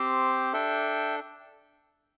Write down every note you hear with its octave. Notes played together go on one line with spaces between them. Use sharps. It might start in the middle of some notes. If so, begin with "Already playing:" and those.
Already playing: C4 G4 C5
D4 A4 E5 G5